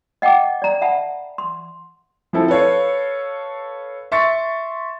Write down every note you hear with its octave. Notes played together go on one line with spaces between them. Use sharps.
D#5 F#5 G5 A5 D6
D5 A#5
E5 F#5 A5 B5
C6
F3 C4 E4 A4
A4 B4 C#5 F5
E5 C6 C#6 A6 C#7